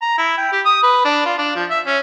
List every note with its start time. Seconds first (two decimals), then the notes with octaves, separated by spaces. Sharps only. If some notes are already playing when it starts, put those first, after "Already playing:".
0.02 A#5
0.18 E4
0.38 G5
0.52 G4
0.66 D#6
0.83 B4
1.05 D4
1.26 F4
1.38 D4
1.56 F3
1.70 E5
1.86 C#4